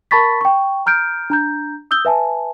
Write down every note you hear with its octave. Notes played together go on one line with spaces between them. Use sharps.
A#4 A5 B5 C#6 A6 B6
G5 C#6
A#5 F6 G6 D7
D4 A#5 G6
D#6 E6 G6 G7
B4 E5 G#5 A5